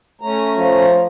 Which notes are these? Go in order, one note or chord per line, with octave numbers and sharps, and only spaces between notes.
A3 C#4 A#5
F3